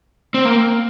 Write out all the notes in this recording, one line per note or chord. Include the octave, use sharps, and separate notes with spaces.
C4
A#3